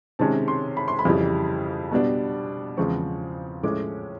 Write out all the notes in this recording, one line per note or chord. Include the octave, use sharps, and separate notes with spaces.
C3 D#3 G#3 C#4 A5
C6
B5
C6
B5
F2 C#3 E3 G3
B2 G3 B3 D4
E2 C#3 F3 G#3 C4 C#6
A2 F3 G#3 C#4 D6